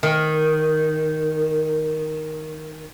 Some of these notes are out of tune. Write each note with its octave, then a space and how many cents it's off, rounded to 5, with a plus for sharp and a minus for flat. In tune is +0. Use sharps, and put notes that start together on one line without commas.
D#3 +0